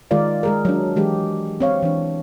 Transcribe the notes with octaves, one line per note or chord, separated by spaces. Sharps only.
D#3 G#3 F4 A#4 D5 F5
G#3 G#4 A#4
F#3 D4
E3 G#3 G4
C4 C#5 F5
E3 D4